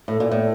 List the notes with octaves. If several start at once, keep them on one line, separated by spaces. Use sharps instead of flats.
A2 A4
A#2
A2